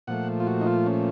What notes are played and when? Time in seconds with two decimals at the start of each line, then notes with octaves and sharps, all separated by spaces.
0.07 A#2 F3 A3 F#5
0.40 F4
0.47 F#4
0.61 D#4
0.67 F4
0.86 C#4